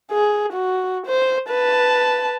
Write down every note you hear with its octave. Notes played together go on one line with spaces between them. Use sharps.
G#4
F#4
C5
B4 A5